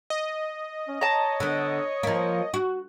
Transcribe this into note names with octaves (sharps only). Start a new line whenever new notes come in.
D#5
C#4
C#5 A5 A#5
D3 B3
F3 A#3
F#4